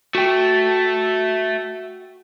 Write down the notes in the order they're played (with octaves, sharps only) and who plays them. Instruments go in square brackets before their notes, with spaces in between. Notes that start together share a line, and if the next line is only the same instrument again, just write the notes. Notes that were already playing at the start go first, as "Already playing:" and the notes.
[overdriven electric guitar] A3 [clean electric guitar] F#4 G5